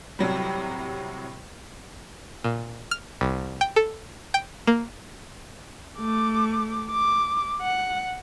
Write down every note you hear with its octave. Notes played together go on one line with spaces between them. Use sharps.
A2 C3 F#3 G3
A#2
F6
C2
G5
A4
G5
A#3
A3 D6
D6
F#5